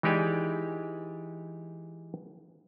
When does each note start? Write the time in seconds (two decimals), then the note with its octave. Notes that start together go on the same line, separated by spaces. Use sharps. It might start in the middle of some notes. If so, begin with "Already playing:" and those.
0.03 E3 G#3 D#4 G4 D5 G#5